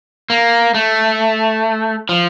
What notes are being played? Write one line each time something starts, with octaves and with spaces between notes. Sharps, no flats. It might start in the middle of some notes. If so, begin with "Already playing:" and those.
A#3
A3
F3